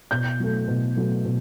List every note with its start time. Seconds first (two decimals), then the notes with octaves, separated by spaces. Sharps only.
0.11 B2 G6
0.40 F#3 A3
0.68 B2
0.96 F#3 A3
1.25 B2